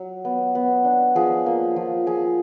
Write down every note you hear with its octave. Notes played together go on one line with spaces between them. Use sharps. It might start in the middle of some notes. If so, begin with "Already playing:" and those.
Already playing: F#3 C#5
B3
B3
D4
F3 G#4
A#3
F3
F3 G#4